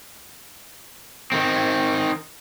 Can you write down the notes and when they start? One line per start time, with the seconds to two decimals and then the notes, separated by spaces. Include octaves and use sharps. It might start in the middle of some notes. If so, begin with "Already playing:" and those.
1.32 D#3 C4